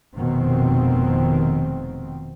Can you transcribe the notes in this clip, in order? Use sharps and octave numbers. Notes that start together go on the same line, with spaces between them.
F1 B2 D#3 C4